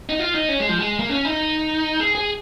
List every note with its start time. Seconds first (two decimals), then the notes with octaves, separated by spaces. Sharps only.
0.09 D#4
0.19 F4
0.35 D#4
0.49 C#4
0.60 G#3
0.69 F3
0.79 G#3
0.99 A#3
1.09 C#4
1.25 D#4
2.00 G#4
2.15 G#4